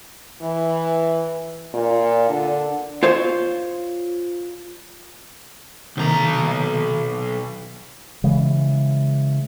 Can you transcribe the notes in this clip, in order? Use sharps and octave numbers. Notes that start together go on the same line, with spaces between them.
E3
A#2
D3
F4 C5 C#5
B1 C3 D#3 A#3 A#5
C#3 E3 G#3